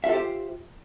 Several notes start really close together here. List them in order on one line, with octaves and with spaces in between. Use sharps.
E5 F4 A4 G4 C5